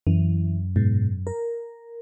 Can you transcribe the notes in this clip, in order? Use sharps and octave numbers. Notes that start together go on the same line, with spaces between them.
F#2 E3
G#2 B2
A#4